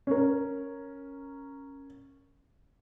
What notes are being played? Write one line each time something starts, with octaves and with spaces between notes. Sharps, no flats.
C#4 A#4